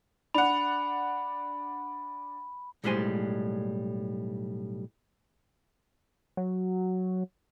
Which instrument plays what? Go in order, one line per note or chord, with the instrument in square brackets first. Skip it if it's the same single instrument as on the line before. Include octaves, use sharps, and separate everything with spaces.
[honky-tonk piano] D4 F#5 [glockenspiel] B5
[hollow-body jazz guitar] B1 A2 G3 G#3 C5 G#5
[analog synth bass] F#3